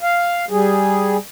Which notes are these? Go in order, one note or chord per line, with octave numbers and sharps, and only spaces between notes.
F5
G3 G#4